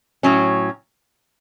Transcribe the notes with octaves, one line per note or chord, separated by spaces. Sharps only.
A2 F#3 C#4